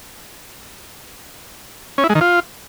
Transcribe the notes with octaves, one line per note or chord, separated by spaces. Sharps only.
C#4
E4
G#3
D#3
F4